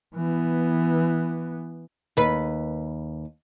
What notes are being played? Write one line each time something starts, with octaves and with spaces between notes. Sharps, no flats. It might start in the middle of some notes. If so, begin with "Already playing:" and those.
E3 B3
D#2 B4